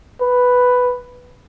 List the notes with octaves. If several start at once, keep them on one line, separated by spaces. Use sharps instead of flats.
B4